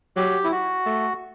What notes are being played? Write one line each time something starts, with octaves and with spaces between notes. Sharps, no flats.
F#3 G4
E4
F#4
A3